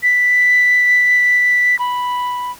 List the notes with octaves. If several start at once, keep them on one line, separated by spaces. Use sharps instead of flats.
B6
B5